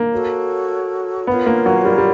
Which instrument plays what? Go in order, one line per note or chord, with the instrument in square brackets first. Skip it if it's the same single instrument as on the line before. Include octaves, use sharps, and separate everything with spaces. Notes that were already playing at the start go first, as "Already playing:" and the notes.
Already playing: [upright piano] A#3
[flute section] F#4 A4 C#5
[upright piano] B3 [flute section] F4 A#4 C#5 F5
[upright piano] A#3
F#3
G3
G3